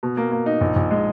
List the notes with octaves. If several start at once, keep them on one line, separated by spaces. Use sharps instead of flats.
B2
A#3
A#3
D#4
A#1
A#1
G#3